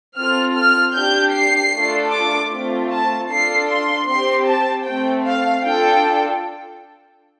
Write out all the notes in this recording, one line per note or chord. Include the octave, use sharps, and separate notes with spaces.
C4 F4 A4 F6
F6
D4 G4 G6
C7
A3 D4 F4 A4
D6
A3 C4 F4
A5
D4 F4 A4 C7
C6
C4 G4 C6
A5
A3 C4 A4 G5
F5
D4 F4 A4 G5